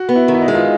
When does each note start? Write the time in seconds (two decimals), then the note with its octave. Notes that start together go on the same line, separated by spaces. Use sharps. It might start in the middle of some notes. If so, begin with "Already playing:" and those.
Already playing: F#4
0.09 B3
0.15 E4
0.28 D#3
0.34 E4
0.41 D#4
0.48 G#3
0.55 F4